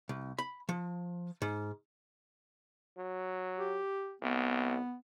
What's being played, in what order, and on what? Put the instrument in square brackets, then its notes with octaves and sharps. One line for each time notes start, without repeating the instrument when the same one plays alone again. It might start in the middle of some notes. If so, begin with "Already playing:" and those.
[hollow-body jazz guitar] C2
B5
F3
G#2
[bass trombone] F#3
[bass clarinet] G4
[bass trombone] C2 [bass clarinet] B3